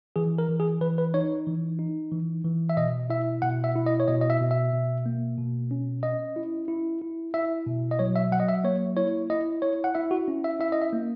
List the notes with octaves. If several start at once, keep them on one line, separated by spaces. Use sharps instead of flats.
E3 G#4
A#4
E3
G#4
E3 B4
B4
D#4 C#5
E3
D#4
E3
E3
E5
B2 D#5
E4 E5
B2 F#5
E5
E4
D#5
C#5
B2 D#5
D#5
E5
B2
E5
B2
A#3
B2
C#4
C#4 D#5
E4
E4
E4
E4 E5
B2
D#5
F#3 C#5
E5
F#3 F#5
D#5
E5
A#3 C#5
E4 C#5
E4 D#5
E4 C#5
F#5
E4 E5
F#4
C#4
E5
E4 E5
D#5
E5
A#3